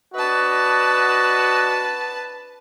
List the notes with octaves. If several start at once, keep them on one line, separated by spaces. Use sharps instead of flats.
D4 F#4 B4 D#5 A5